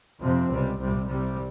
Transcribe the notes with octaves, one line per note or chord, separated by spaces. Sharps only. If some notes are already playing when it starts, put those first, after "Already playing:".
F2 C3 F3 C4
C#2 C3 G3
C2 C3 G3
C2 C3 G3